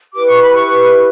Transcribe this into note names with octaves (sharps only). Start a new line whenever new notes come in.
E4 G4 B4 D6
C#6
B5
C#6